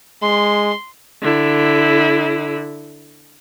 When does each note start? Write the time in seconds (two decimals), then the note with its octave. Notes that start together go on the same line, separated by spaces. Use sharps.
0.22 G#3 C6
1.23 D3 E4